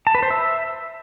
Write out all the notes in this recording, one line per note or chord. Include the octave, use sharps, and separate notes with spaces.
A5
B4
C5
E5